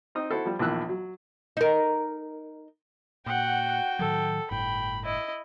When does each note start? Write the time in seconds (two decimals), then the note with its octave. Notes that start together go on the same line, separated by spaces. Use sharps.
0.15 C4 D#4 D#6
0.30 E4 F#4 A4 C5
0.45 F3 G3
0.59 A#1 E2 A#2 D#3 E6 F#6
0.89 F#3
1.57 D#4 A#4
3.26 A#2 F#4 F#5 G5
3.99 A2 D#3 F#3 A4
4.51 G1 A2 G5 B5
5.05 E4 D#5